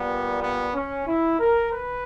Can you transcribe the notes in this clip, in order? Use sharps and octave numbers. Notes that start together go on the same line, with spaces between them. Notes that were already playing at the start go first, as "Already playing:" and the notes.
Already playing: A#2 G3 A#3 B3
B3
C#4
E4
A#4
B4